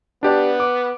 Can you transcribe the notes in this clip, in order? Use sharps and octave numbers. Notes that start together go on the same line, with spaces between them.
B3 D4 G4 D5
D6